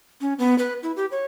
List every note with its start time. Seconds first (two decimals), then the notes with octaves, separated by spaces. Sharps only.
0.21 C#4
0.39 B3
0.58 B4
0.83 E4
0.96 G4
1.11 C#5